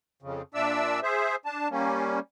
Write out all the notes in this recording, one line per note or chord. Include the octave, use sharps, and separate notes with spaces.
F2 C#3
A#2 D4 D5 E5 E6
G#4 C5 E5
D4 A5
G3 A#3 C#4